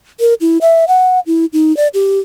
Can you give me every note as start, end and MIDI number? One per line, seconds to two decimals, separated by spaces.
0.20 0.34 70
0.41 0.58 64
0.61 0.85 76
0.88 1.19 78
1.26 1.45 64
1.53 1.75 63
1.77 1.88 74
1.94 2.19 67